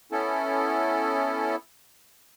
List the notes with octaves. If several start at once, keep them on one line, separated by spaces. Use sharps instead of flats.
B3 C#4 E4 A4